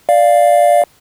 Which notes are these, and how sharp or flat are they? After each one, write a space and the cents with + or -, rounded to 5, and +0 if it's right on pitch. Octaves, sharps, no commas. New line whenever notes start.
D5 +0 F5 +0